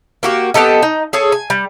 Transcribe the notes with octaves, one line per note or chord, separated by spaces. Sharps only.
A#3 F#4 G4
B3 G4 A4 D#5
D#4
G#4 A4 C#5
G#5
G3